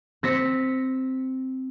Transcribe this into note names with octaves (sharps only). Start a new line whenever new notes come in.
C4 A#6 B6 C#7